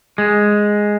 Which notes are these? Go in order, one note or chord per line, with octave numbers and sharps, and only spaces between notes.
G#3